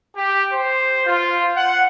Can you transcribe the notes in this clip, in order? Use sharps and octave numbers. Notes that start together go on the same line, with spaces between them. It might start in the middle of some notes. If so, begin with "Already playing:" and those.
G4
C5
F4
F#5